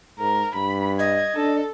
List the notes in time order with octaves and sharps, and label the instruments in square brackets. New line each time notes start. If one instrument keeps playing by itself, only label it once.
[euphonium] G#2 [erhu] A#4
[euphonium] G2 [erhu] B5
[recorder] D#5 [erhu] G#6
[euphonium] D4 [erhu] A4